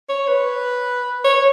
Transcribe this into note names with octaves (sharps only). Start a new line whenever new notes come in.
C#5
B4
C#5